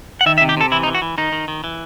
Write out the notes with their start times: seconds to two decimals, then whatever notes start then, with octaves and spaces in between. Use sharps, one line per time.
0.21 F#5
0.26 D#3 E5
0.38 E5
0.41 C3
0.49 G4
0.57 C3 A4
0.72 E3 E4
0.83 D#4
0.87 E3
0.95 F#4
1.02 E3
1.18 D#3 D#4
1.32 D#3
1.48 D#3
1.64 E3